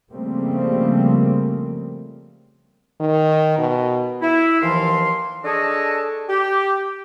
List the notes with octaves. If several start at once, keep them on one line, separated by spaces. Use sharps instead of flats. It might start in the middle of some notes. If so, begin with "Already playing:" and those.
C#3 F3 G3 A3 A#3 C4
D#3
B2
E4
D#2 E3 F3 F5 C6
D4 G#4 A4 C#5 D#5 A5
G4